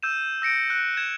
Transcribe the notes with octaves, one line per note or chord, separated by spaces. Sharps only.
E6 G6 D#7 E7
E6 A#6 C#7 D7
F#6
G#6 E7